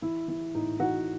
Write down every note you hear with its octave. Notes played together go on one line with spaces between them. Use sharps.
E3 E4
E3 E4
A2 D#4
E3 D#4 F#4